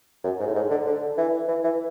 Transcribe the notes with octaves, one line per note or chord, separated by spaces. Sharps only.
F#2
G#2
A2
G#2
D3
D3
E3
E3
E3